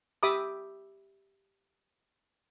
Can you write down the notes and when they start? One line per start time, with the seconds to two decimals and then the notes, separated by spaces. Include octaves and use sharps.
0.23 G4 E5 B5 D6 D#6